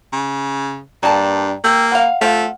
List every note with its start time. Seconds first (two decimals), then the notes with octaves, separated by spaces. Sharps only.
0.13 C#3
1.03 G2 A#3 D5 G5 A5 A#5
1.64 A#3 G4 G5 E6 G6
1.92 B4 F5 F#5
2.21 F3 A3 C4 F5